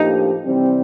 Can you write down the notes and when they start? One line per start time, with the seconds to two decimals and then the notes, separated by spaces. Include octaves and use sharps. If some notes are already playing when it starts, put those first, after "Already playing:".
Already playing: A2 F3 A#3 D4 D#4 G4
0.45 C3 E3 G3 C4